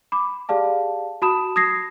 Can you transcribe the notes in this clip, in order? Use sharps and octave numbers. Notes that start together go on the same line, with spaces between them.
B5 D6
G4 G#4 D5 F5 A5
F#4 A5 B5 D#6 E7
D#6 G#6 A#6 C7